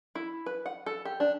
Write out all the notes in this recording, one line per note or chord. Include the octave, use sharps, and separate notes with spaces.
E4
B4
F#5
A4
G4
D4